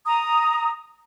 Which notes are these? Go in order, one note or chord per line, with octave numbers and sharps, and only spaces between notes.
A#5 D#6